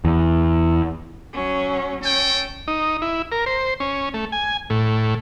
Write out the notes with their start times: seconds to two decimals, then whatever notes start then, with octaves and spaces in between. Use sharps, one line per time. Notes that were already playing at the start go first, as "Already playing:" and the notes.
0.05 E2
1.33 F#3 C#4
2.03 C#4 A4 G5
2.68 D#4
3.02 E4
3.32 A#4
3.46 C5
3.80 C#4
4.14 A3
4.32 G#5
4.70 A2